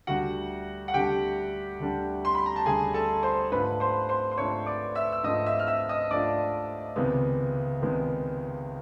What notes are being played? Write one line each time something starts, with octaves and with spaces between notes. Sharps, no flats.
D2 D3 G3 F#4 F#5
F#5
D2 D3 G3 G4 G5
D2 D3 G3
C6
B5
A#5
A5
D2 D3 G3 G#4 G#5
A4 A5
C5 C6
G#2 F3 A3 D4 B4 B5
C5 C6
C5 C6
C6
G#2 F3 A3 D4 C#5 C#6
D5 D6
E5 E6
E6
G#2 F3 A3 D4 D#5 D#6
E5 E6
F6
E5 E6
D#5 D#6
G#2 F3 A3 D4 D5 D6
C#2 C3 D#3 G#3 B3
C#2 C3 D#3 G#3 B3